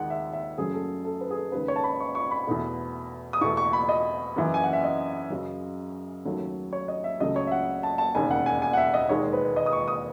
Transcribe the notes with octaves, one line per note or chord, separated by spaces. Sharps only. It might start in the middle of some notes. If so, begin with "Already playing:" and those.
Already playing: D#2 D#3 G#3 F#5
E5
E5
F#2 C#3 F#3 A3 G#4
A4
A4
B4
G#4
A4
D#2 C#3 G#3 B4
C#5
A5
B5
C#6
C#6
B5
E2 B2 A3
D#6
E2 B2 A3 C#6
C#6
B5
D#5
F#2 C#3 E3
G#5
F#5
E5
D#5
F#2 C#3 F#3
D#2 C#3 F#3 A3
C#5
D#5
E5
C#2 C#3 F#3 A3 D#5
C#5
E5
F#5
A5
A5
E1 D#2 C#3 G#5
F#5
G#5
G#5
F#5
E5
D#5
E1 D#2 D#3 G#3 C#5
B4
D#5
D#6
C#6
D#6